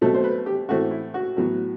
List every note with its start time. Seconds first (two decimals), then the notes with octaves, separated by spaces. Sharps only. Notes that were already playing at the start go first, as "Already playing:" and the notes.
0.01 B2 F#3 A3 C4 A4
0.14 C5
0.24 B4
0.46 G4
0.69 A2 E3 A3 C4 F#4
0.91 E4
1.14 F#4
1.37 A2 F#3 B3